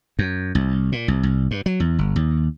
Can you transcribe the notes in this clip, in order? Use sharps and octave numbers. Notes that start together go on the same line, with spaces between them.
F#2
C2
A#2
C2
C2
G2
F#3
E2
G1
D#2